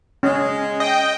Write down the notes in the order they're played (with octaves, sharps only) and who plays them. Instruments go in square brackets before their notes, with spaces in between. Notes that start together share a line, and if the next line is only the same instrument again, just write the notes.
[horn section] G#3 [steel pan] C#4
[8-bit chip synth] D#5 [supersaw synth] G5